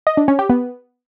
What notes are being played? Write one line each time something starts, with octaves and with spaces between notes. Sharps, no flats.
D#5
D4
C#4
G4
B3